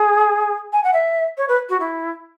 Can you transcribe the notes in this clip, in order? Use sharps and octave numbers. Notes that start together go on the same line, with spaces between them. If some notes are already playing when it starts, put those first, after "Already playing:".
Already playing: G#4
G#5
F#5
E5
C#5
B4
F#4
E4